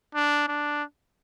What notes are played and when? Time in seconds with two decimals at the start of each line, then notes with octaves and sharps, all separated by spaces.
0.15 D4
0.48 D4